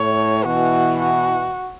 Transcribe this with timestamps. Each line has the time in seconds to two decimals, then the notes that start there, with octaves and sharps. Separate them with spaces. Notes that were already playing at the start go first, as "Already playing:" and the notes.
Already playing: A2 C#5
0.45 B2 E3 F#4
0.99 F#4